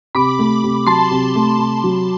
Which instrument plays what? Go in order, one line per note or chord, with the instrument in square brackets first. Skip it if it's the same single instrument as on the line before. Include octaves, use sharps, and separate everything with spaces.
[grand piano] C3 [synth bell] B5 D6
[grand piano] A3
C3
[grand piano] F#3 [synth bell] A5 C6
[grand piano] C3
A3
C3
F#3